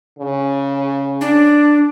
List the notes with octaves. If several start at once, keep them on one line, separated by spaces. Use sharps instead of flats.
C#3
D4